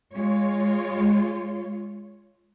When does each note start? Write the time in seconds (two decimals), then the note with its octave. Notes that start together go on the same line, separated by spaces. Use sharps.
0.12 G#3 F4 C#5